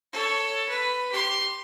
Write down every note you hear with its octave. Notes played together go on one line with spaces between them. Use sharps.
A4 C#5
B4
G4 C6